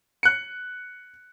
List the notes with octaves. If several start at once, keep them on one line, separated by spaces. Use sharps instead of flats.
F#6 C#7